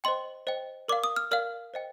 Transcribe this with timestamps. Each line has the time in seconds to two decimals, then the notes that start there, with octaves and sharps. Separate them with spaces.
0.04 C5 D#5 G5 C6
0.47 C5 D#5 G5
0.88 A#4 D5 F5 D6
1.04 D#6
1.16 F6
1.31 A#4 D5 F5 F6
1.74 C5 D#5 G5